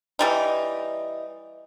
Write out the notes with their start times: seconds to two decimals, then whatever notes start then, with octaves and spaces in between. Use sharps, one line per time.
0.19 E3 G3 D#4